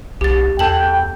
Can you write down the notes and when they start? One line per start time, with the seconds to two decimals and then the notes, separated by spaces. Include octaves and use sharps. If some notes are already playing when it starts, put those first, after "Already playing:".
0.21 B1 G4 A6
0.59 E2 A4 G5 A5 F#7